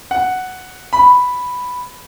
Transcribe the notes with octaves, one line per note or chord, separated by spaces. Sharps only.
F#5
B5